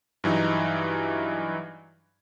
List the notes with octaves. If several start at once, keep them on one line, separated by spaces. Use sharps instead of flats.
G2 E3 F#3 D#4